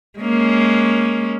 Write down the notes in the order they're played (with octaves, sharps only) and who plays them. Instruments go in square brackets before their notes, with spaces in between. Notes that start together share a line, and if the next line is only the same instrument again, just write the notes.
[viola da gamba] G#3 A#3 C#4